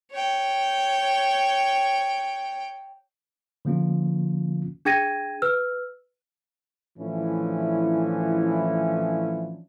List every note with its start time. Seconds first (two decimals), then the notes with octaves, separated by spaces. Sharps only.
0.12 C#5 G5
3.65 D3 F3 A#3 C#4 F4
4.85 D4 G#4 G5 G#6 A#6 D#7
5.42 B4 E6 F6
6.98 A2 E3 F3 C#4 D4 E4